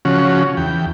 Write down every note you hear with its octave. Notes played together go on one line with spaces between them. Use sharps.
C#3 F3 C#4 F#4
E2 G5